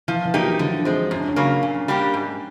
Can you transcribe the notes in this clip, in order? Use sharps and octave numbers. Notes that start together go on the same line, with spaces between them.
E3 F3
E3
F#3 A#3 D#4 G4
F3
D3 F#3
F3 G#3 C4
F#2 C#4
D4
C#4
C#3 F#3 A#3
A#2
G3 A#3 D4 G4
G#2